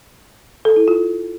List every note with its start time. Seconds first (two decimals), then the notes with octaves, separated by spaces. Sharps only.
0.65 A4
0.76 E4
0.88 F4